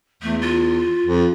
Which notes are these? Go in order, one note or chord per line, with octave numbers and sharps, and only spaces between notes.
E2 A3
F4
F2